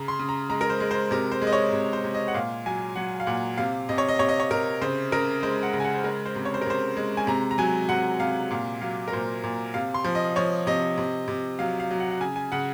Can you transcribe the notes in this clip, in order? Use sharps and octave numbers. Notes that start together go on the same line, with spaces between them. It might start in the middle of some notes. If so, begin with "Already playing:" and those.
Already playing: C#3 A#5
C6
C#3
A#5
G#3 A#5
A#4
C5
G#3
C5
C3 A#4
C5
G#3
D#5
C#5
C3
C5
C3
D#5
F#5
A#2 F5
F#3 G#5
F#3 F#5
F5
A#2 F#5
C3 F5
C3 D#5
C#5
D#5
C3 C#5
D#5
C#5
C3 A#4
C#3 C5
C#3 A#4
G#3 C5
F#5
C#3
G#5
F#5
C5
G#3 A#4
C5
C3
C#5
C5
A#4
C3 C5
G#3
G#5
C3 A#5
A#5
F#3 G#5
C3 F#5
C3 F5
A#2 F5
F#3 F5
A#4
A#2 C5
A#2
C3 F5
C6
F3
D#5
F3 C#5
C3 D#5
C3
C3
F#3 F5
F5
F#3
F#5
F#5
C#3 G#5
G#5
C#3 F#5